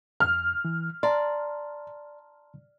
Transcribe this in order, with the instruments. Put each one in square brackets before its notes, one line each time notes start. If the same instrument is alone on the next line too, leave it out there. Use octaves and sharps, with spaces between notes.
[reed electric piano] F2 [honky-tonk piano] F6
[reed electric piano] E3
[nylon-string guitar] D5 [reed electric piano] A5 A#5 C6